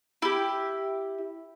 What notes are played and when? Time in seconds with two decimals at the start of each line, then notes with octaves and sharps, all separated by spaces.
0.22 E4 G4